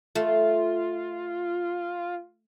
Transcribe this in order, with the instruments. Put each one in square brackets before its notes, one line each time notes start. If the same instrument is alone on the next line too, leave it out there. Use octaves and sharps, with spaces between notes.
[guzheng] A3 [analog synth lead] F4